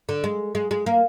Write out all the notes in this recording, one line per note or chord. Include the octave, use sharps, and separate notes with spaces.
D3
G#3
G#3
G#3
A#3